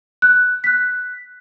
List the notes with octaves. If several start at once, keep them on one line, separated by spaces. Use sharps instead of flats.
F#6
F#6 B6